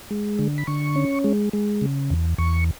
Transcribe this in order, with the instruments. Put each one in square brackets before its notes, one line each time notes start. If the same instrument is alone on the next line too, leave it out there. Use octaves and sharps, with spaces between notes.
[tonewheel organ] G#3
D3
B5
D3 C#6
C#4
G#3
G#3
C#3
E2
E2 C#6